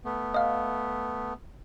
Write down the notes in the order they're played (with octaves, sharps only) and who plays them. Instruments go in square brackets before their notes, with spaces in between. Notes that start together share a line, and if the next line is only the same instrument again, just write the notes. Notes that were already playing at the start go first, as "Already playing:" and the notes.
[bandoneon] A3 B3
[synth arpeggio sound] D#5 F5